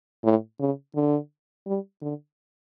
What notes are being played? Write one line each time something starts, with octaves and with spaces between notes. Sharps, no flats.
A2
C#3
D3
G3
D3